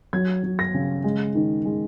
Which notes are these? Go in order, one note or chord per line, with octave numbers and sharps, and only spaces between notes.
F#3 G#6
F#3
A#6
C#3
G#3
D#3
G#3